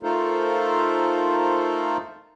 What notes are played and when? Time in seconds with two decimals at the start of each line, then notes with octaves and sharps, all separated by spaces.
0.03 A3 D#4 F4 A4 A#4 C5